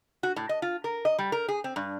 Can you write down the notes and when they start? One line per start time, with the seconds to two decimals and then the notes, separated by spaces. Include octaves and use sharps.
0.23 F#4
0.36 A2
0.49 D#5
0.62 F4
0.84 A#4
1.05 D#5
1.19 G3
1.32 A#4
1.49 G#4
1.64 C4
1.76 G2